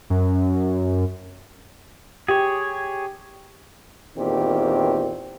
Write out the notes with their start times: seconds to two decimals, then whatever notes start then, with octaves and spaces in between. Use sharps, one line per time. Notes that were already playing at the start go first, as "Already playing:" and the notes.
0.10 F#2
2.28 G4 G#4 C#5
4.17 E2 A#2 D#3 C4 G4